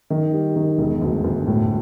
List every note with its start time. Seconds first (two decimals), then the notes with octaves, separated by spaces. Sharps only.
0.10 D#3
0.32 G3
0.56 D#3
0.78 E1
1.02 D2
1.24 D2
1.47 A2